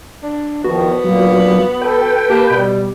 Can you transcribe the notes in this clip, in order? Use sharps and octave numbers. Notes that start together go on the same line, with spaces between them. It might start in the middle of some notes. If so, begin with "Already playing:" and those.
D4
E2 D#3 F3 B3 F#4
D2 A#2 F#3 A#3
A4 B4 G5
A#3 G4 A5
B2 G3